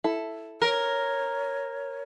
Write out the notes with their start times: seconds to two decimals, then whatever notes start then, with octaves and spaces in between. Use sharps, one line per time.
0.04 E4 A4
0.62 A#4 C#5